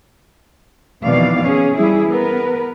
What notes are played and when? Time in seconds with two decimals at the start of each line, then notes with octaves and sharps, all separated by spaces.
1.03 F2 B2 D#3 E3 D5 F5
1.45 C#4 G#4
1.76 E3 G3 E4 G#4
2.09 B3 A#4 B4